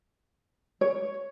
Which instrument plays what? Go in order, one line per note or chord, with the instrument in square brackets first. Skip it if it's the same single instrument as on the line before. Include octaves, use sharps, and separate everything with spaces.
[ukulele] C#5